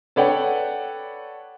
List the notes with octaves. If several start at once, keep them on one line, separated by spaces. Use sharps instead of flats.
A4 B4 C#5 D5 F#5 G5